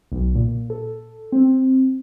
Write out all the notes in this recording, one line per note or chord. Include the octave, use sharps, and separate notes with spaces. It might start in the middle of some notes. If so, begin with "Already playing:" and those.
B1
A#2
A4
C4